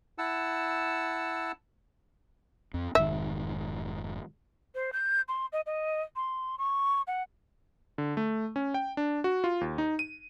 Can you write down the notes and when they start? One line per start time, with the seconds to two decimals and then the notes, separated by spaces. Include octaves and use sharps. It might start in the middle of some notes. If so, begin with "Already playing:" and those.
0.18 E4 F#5 A5 E6
2.74 F2 C4
2.95 F1 G#2 D#3 E5
4.75 C5
4.93 G6
5.28 C6
5.53 D#5
5.66 D#5
6.16 C6
6.59 C#6
7.07 F#5
7.98 D3
8.17 A3
8.56 C#4
8.74 G5
8.97 D4
9.24 F#4
9.44 F4
9.61 D#2
9.78 D#4
9.99 D#7